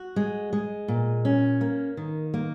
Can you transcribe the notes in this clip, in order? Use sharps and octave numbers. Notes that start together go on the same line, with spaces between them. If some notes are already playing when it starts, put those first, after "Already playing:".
Already playing: F#4
G#3
G#3
A#2
C#4
A#3
D#3
A#3